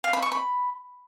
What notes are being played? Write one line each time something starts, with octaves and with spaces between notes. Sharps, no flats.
F5
B5
C#6
B5